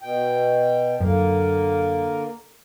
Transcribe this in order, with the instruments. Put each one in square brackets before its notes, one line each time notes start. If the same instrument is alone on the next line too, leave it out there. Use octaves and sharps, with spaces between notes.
[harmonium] B2 G5
[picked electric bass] F#2 [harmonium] D3 A#3 A#4